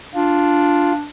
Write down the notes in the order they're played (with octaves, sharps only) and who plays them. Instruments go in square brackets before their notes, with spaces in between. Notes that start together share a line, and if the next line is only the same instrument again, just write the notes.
[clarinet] D4 [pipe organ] F4